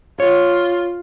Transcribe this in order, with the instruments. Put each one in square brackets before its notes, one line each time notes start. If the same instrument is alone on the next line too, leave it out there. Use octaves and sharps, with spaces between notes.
[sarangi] F4 [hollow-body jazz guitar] C#5